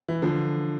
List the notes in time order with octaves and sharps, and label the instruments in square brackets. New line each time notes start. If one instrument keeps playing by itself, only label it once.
[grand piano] E3
D3 F3